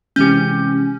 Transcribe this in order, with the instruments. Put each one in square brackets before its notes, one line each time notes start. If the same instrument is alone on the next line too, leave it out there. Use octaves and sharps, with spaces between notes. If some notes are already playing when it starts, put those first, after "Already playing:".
[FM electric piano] C3 E3 G#3 [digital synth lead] C#4 [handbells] G4 G6